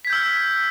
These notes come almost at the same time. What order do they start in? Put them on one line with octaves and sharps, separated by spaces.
B6 G#6 G6 E6 F6